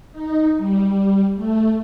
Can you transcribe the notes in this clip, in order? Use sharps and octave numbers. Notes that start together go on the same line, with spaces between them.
D#4
G3
A3